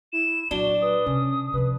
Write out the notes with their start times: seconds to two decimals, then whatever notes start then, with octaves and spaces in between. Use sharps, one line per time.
0.13 E4 E7
0.51 A#2 F#3 D4 F#4 G7
0.82 B4 D#6
1.06 C3 C#4
1.53 C3 F3 B4